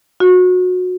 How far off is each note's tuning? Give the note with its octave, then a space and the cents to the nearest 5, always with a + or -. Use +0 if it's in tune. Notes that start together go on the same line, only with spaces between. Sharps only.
F#4 -25